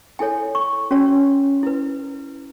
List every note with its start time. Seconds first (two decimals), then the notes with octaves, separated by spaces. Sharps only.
0.19 E4 A4 C#5 G#5
0.55 C#6
0.91 C#4 F#4 C#5
1.63 E4 B4